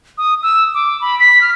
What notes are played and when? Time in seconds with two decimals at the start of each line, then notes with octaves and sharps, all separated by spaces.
0.18 D#6
0.43 E6
0.74 D6
1.01 B5
1.20 B6
1.41 F6